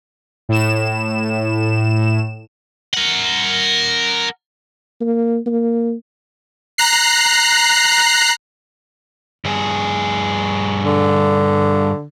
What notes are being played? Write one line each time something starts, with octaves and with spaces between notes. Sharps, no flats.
A2 E7
A#4 F#5
A#3
A#3
A#5 F#6 C7
G2 G#4
D3